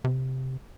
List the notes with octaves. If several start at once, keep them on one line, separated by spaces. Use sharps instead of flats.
C3